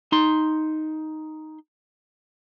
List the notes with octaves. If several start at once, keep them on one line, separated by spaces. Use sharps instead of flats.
D#4 C6